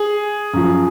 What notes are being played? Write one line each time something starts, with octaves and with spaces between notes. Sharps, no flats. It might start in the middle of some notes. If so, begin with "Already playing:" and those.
Already playing: G#4
F#2 F3